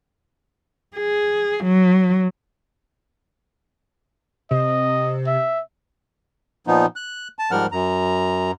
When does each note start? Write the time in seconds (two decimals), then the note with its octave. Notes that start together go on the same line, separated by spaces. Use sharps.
0.96 G#4
1.64 F#3
4.51 C3 D#5
5.27 E5
6.67 A#2 F3 B3 D#4
6.96 F#6
7.39 A5
7.51 G#2 F3 G3 A#4 F#5 F6
7.72 F#2 A#5